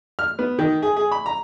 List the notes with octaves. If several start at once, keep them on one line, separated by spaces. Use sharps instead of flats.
F6
B3
D#3
G#4
G#4
B5
A#5